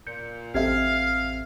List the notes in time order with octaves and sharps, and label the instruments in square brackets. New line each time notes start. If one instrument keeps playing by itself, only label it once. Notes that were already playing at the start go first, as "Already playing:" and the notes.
[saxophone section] A#2 [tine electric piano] G6 C#7
[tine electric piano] A1 C4 G#6 [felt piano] G4 A4 E5 [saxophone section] F5